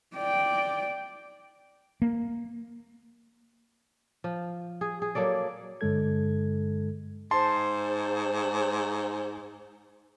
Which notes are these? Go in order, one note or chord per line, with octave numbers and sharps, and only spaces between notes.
D5 G5
A#3
F3
G#4
G#4
F#3 A#3 A4 D5
G2 D3 G#3 A4 G#6
G#2 C5 A5 C6